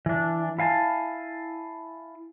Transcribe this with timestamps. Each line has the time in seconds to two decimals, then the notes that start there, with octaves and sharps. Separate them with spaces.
0.06 E3 D4
0.59 E4 F5 G#5 A5